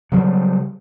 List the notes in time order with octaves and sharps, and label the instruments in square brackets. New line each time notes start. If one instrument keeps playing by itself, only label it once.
[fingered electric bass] C#3 F#3 G3